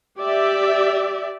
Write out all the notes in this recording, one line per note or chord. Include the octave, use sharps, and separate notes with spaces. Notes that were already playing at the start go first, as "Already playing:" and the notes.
G4 D5 E5